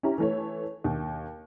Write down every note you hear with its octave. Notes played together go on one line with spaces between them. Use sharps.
C#4 E4 G4 A#5
E3 A3 C#5
D#2